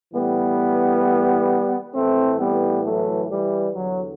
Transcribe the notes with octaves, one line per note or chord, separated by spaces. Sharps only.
A2 E3 G3 B3
A2 E3 A3 C4
G3 B3
F#3 A3
E3 G3
E2 D3 F#3